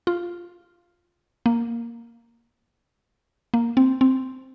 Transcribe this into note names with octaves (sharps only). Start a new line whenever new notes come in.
F4
A#3
A#3
C4
C4